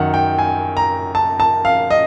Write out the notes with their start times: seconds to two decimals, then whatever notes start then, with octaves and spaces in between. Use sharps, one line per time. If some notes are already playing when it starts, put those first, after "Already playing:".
Already playing: F#2 D#3 F#3 F#5
0.14 G5
0.39 G#5
0.77 A#5
1.15 A5
1.40 A5
1.65 F5
1.90 D#5